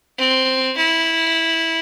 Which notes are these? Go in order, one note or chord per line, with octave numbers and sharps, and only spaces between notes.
C4
E4